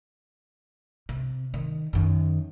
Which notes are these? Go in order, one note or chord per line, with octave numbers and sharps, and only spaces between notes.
C3
D#3
F#2 D#3